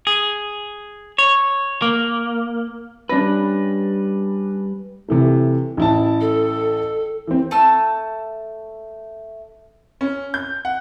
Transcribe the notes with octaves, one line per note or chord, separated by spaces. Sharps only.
G#4
C#5
A#3
G3 C#4 D4 B4 A#6
C3 E3 A3
A1 E4 A5
A4
E3 C4
A3 A5 E6
C#4
G6
F#5